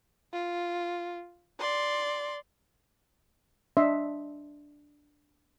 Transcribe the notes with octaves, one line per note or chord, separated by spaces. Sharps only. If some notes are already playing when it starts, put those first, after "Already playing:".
F4
D5 C6
D4 D#5 E5 C6